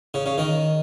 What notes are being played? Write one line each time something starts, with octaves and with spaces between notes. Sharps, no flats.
C#3
C#3
D#3